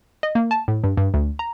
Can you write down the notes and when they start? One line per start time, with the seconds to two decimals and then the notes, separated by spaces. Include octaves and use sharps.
0.23 D#5
0.35 A#3
0.51 A5
0.68 A2
0.84 G2
0.97 G2
1.14 D2
1.39 A#5